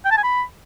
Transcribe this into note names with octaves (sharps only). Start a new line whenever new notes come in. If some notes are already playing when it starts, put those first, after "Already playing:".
G5
A5
G#5
B5